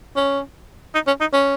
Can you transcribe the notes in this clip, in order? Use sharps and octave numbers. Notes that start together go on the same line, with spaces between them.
C#4
D#4
C#4
D#4
C#4